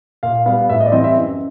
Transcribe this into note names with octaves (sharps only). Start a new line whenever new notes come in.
A#2 F5
G3 B3 F5
A2 E5
D#5
D5
E3 G3 C4 D#5
E5
F#2